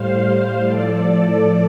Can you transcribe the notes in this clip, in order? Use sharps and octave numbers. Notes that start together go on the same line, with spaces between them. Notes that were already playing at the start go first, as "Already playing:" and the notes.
Already playing: A2 G3 C5 F5
A2 F3 A4 D5